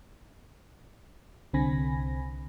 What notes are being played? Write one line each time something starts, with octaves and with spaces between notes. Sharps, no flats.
C2 D3 C4 G#5 B5 A#6